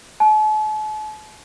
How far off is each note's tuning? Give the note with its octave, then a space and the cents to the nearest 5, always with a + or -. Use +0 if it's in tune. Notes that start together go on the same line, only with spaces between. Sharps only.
A5 -45